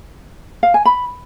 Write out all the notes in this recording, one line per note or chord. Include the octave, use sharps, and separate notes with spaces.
F5
G#5
B5